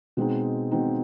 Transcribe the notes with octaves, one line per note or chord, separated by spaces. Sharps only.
B2 G#3 C4 D#4
B2 G#3 C4 D#4